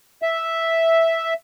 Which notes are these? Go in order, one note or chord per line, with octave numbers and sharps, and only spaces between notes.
E5